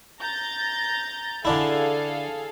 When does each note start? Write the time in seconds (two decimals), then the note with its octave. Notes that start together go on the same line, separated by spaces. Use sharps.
0.21 A#5 G6 A6
1.45 D3 D4 E4 G#4 A4 F5